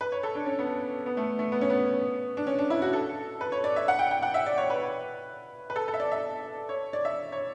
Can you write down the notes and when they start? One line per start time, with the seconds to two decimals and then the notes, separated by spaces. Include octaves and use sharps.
0.01 B4
0.12 C#5
0.23 A4
0.35 D4
0.46 C#4
0.59 B3
1.06 B3
1.17 A3
1.39 A3
1.52 B3
1.61 C#4
1.70 B3
2.37 D4
2.47 C#4
2.59 D4
2.70 E4
2.82 F#4
2.93 A4
3.41 B4
3.52 C#5
3.64 D5
3.76 E5
3.88 F#5
3.99 G5
4.11 G5
4.23 F#5
4.34 E5
4.46 D5
4.58 C#5
4.70 B4
5.70 B4
5.76 A4
5.88 A4
5.94 E5
6.00 D5
6.11 E5
6.69 C#5
6.93 D5
7.05 E5
7.32 C#5